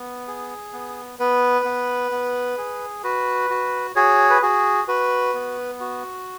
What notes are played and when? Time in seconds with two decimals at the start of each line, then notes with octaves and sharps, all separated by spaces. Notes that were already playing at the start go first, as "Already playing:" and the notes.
Already playing: B3
0.28 G#4
0.73 B3
1.19 B3 B4
1.65 B3
2.12 B3
2.58 G#4
3.04 F#4 B4
3.50 F#4
3.96 F#4 G#4 C#5
4.30 B4
4.42 F#4 G#4
4.88 F#4 B4
5.34 B3
5.80 F#4